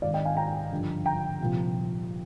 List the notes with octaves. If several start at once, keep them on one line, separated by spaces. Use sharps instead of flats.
G#1 G#2 D#3 D5 F5
D#5 G5
F5 G#5
G5 A#5
G1 G2 D3 F3
G5 A#5
C2 A#2 F3